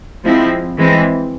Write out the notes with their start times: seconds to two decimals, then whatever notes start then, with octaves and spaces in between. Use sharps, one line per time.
0.24 F3 G#3 C4 E4
0.77 E3 G#3 C4